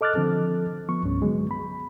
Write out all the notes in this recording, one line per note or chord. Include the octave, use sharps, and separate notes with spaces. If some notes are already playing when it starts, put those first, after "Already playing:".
A4 D#5 D6 F6 F#6 A6
D3 F3 C4 A4
F3 B3 C#6
C2 G2 C#4
D3 F#3 G#3 B3
B5